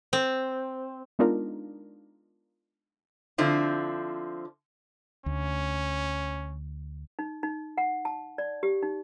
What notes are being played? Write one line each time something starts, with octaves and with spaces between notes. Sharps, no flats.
C4
G#3 B3 D4 D#4 F4 A#4
D3 F3 C4 E4
D2 C#4
D#4
D#4
F#5
A5
D5
G4
D#4